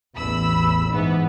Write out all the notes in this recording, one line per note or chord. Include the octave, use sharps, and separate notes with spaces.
A1 E2 B5 E6
G#2 E3 B3